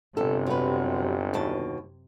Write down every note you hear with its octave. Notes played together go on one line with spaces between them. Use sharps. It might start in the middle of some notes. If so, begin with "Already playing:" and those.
G1 F#2 C3 A4
F#3 B4
D#2 B2 A5